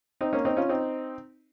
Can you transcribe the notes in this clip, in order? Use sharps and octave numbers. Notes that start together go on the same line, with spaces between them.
C4 D#4
A#3 C#4
C4 D#4
C#4 F4
C4 D#4